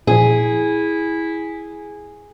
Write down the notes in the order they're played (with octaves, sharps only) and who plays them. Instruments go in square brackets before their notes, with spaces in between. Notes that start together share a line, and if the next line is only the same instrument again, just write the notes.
[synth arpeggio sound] A#2 F3 [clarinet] E4 [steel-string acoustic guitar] G#4